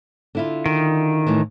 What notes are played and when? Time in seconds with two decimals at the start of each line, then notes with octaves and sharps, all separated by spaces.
0.35 D3 E4 F4
0.66 D#3
1.27 A2 E3